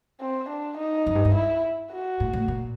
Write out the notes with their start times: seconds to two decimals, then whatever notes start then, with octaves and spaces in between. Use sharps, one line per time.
0.20 C4
0.49 D4
0.77 D#4
1.07 F#2
1.15 G2
1.25 G2
1.35 E4
1.92 F#4
2.20 A2
2.33 A2
2.48 A#2